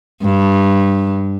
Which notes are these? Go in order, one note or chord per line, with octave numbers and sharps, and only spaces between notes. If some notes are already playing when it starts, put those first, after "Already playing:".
G2